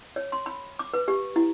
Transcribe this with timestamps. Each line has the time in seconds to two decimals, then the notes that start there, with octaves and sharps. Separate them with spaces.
0.16 C#5
0.32 C6
0.46 B5
0.79 D6
0.94 B4
1.08 G4
1.36 E4